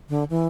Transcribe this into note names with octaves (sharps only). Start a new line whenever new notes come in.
D3
E3